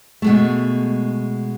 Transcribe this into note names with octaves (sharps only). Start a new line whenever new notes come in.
B2 G#3 A3